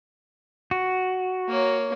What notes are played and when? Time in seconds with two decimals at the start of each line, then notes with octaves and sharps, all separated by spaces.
0.71 F#4
1.49 A#3 C#5